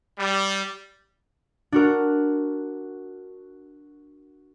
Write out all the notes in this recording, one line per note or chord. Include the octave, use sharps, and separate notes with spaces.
G3
D4 F#4 A#4